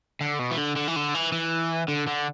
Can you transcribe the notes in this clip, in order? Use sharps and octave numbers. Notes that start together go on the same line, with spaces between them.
D3
B2
E3
D3
D3
E3
D3
E3
E3
D3
D3